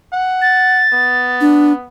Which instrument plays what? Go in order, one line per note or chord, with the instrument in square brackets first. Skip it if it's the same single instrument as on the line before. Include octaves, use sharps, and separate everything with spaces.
[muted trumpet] F#5
[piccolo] A6
[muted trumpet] B3
[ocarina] D4